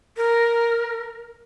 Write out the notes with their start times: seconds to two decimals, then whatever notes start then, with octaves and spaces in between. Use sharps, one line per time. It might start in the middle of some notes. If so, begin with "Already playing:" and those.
0.17 A#4